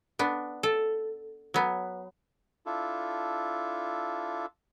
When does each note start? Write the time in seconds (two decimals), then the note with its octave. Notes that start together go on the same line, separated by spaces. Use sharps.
0.19 B3 D4
0.63 A4
1.54 F#3 B3
2.66 D4 E4 F4 A4